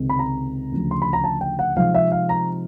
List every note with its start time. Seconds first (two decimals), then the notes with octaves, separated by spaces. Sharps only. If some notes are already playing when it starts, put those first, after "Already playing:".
Already playing: C#2 C3 D#3 G#3 C4
0.10 B5
0.19 A#5
0.71 D2 C#3 F3
0.91 C6
1.02 B5
1.13 A#5
1.24 A5
1.41 G5
1.59 F#5
1.77 C3 F3 G#3 C4 D#4 F5
1.94 E5
2.12 F5
2.29 A#5